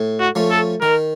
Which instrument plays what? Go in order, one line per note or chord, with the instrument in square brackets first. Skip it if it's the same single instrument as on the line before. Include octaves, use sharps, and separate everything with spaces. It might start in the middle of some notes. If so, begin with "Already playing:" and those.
Already playing: [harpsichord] A2
[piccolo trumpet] F#4
[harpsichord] F3 A3 C#4
[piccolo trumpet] A4
[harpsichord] D#3 [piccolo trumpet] A#4